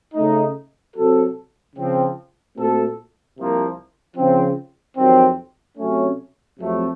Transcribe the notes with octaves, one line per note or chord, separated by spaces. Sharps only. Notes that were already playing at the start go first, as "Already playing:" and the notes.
C#3 A3 D#4
C3 F#3 C4 F#4 A4
C#3 F3 C4
A#2 A3 C4 F#4 A4
C2 C3 F3 A#3
C#3 F3 C4
F2 C3 D#3 F#3 C4
C3 F#3 A3 C#4
F2 C3 F#3 A3